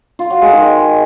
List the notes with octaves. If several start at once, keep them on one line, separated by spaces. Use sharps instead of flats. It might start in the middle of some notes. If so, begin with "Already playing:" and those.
F4
F#3
G#3
D#3